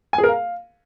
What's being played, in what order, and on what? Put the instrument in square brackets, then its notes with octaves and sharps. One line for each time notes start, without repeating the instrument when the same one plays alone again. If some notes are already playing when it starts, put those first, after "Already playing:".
[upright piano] G#5
G#4
A#4
F5